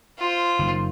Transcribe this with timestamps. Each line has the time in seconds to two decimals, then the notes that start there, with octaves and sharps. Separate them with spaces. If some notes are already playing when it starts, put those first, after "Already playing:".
0.18 F4 C5
0.59 F#1 D#3